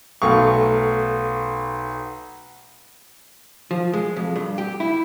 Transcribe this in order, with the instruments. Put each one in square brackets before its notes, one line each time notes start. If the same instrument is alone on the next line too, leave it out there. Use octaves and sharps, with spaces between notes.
[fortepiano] B1 A3 F5 C#6
[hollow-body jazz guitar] F3
G#3
F2
G2
G4
E4